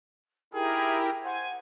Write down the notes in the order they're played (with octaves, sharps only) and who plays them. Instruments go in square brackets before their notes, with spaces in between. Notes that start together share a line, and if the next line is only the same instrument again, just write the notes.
[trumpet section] D#4 G#4 [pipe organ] E4 G4 A#4 [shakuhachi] G5
[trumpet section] C5 [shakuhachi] F#5 [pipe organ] G#5